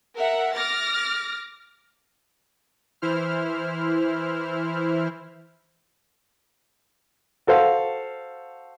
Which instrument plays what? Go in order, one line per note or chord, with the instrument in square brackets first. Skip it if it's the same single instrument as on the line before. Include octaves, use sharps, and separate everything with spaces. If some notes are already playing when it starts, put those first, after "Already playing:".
[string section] A#4 E5 F#5
D6 F6 A6 A#6
[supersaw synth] E3 E4 C5 F6
[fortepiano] F#4 A4 C5 F5